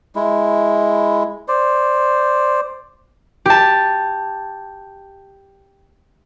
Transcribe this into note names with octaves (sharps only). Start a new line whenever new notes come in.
G#3 E4
C5 D5
G4 A5